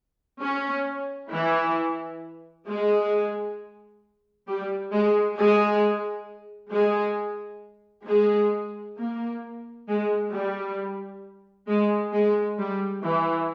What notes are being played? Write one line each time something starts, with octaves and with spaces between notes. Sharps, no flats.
C#4
E3 E4
G#3 G#4
G3 G4
G#3 G#4
G#3 G#4
G#3 G#4
G#3 G#4
A#3
G#3
G3
G#3
G#3
G3
E3